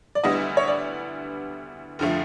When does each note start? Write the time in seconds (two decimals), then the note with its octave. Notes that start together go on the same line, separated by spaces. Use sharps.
0.15 D5
0.24 D2 D3 G3 B3 E4 D#5
0.57 C#5
0.68 D5
1.99 F1 D3 F3 A3